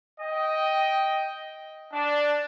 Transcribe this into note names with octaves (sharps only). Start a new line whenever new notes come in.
D#5 G5
D4